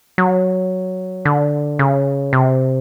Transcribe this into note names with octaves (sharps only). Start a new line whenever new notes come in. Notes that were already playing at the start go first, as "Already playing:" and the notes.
F#3
D3
C#3
C3